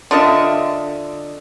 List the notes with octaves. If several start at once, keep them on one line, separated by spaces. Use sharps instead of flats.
D3 F4 D#5 E5